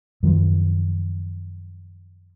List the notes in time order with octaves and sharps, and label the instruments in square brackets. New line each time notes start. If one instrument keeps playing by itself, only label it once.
[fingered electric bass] F#2 D#3 F3